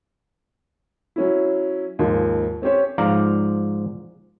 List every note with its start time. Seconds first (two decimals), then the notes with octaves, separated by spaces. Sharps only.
1.16 F#3 C#4 E4
1.99 D#2 G#2 F3
2.62 C4 C#4 G4 C5 C#5
2.98 G#2 F3 D5 F5 A#5